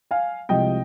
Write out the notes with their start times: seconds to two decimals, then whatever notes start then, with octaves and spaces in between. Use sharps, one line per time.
0.11 F5 G#5
0.49 C2 C3 F3 G#3 D#5 G5